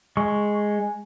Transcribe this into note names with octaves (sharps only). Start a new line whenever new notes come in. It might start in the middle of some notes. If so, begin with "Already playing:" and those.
G#3 C#6